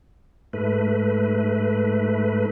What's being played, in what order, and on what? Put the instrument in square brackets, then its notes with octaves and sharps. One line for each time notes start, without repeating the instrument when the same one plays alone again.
[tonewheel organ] G#2 A3 B4